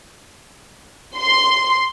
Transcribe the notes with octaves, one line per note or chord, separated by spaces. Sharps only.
C6